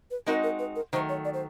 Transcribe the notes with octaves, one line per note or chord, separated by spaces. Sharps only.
B4
G#3 C4 D#4 F#4 A#4
A#4
B4
A#4
D#3 F#3 A3 C5
C#5
D5
C5